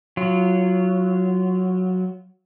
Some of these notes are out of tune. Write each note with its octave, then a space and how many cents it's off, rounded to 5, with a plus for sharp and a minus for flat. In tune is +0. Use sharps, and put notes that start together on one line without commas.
F#3 -5 F4 -20